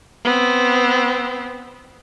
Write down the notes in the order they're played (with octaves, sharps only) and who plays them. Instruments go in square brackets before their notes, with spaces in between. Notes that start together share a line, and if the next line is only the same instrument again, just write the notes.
[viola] B3 C4